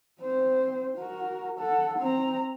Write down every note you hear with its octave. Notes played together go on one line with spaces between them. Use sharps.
C4 C5
F#4 A#4
A4 F#5
C4 A#5